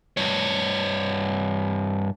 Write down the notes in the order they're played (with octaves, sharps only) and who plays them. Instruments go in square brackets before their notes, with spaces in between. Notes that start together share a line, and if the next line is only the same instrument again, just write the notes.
[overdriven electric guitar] G2 C#5